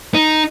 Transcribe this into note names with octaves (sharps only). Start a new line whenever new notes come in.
D#4